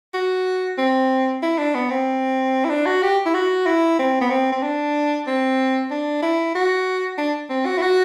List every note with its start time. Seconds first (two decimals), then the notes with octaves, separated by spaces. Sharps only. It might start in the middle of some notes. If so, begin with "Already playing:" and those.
0.14 F#4
0.78 C4
1.43 E4
1.58 D4
1.75 B3
1.90 C4
2.65 E4
2.70 D4
2.86 F#4
3.03 G4
3.26 E4
3.34 F#4
3.66 E4
3.99 C4
4.21 B3
4.30 C4
4.52 C4
4.62 D4
5.27 C4
5.90 D4
6.22 E4
6.55 F#4
7.18 D4
7.50 C4
7.66 F#4
7.78 E4
7.82 F#4